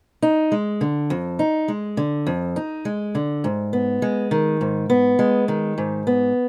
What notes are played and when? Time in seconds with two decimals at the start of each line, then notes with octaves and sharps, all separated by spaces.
0.22 D#4
0.52 G#3
0.81 D3
1.10 F2
1.39 D#4
1.68 G#3
1.97 D3
2.27 F2
2.56 D#4
2.85 G#3
3.15 D3
3.44 G#2
3.73 B3
4.02 G#3
4.31 D#3
4.61 G#2
4.90 B3
5.19 G#3
5.48 D#3
5.78 G#2
6.07 B3